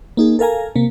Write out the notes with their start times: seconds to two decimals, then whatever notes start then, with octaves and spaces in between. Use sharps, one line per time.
0.17 A#3 D#4 G#4
0.39 A4 A#4 F5 G#5 A#5
0.76 C3 A#3